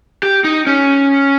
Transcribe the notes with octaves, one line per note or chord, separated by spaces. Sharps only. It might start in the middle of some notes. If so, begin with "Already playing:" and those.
G4
D#4
C#4